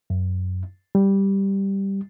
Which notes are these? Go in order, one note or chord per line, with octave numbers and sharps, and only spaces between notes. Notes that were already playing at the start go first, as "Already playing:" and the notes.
F#2
G3